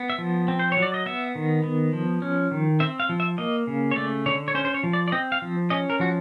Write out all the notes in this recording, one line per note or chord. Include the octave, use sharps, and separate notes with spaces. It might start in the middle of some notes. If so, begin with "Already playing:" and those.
Already playing: B3
E5
F3
C4
C5
C#5
F#3
D5
D#5
B3 E5
D#3
B3
F3
C#4
D#3
C4 E5
F5
F3
E5
A#3 D#5
C#3
C#5
A3 D5
D3 C#5
C#5
C#4 C5
C5
C#5
F3
D5
D5
C4 D#5
F5
F3
C#4 D#5
A#4
F3 F#4